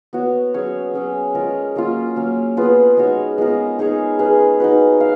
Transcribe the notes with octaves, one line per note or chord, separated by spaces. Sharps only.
B3 F#4 C#5
F#3 C#4 G#4 C#5
F#3 C#4 G#4
G#3 C#4 F4 A#4
F#3 A#3 C#4 F4
F#3 A#3 C#4
B3 F4 G#4 B4
G#3 D#4 F#4 C#5
G#3 B3 F4 A#4
D#4 G#4 C#5
C#4 G#4 B4
D#4 F#4 B4
F5